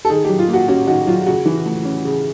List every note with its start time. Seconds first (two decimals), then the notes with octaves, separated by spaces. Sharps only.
0.05 A4
0.10 D#3 G#4
0.25 F#3 G4
0.39 F4
0.48 A#3
0.53 F#4
0.68 C#4 F#4
0.87 D#3 F#4
1.07 F#3 F4
1.26 C#3 F#4
1.46 E3
1.66 A3
1.85 C#4
2.05 C#3